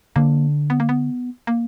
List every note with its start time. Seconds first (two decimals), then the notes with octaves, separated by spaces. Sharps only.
0.16 D3 A#3
0.70 B3
0.80 A#3
0.89 B3
1.47 A#3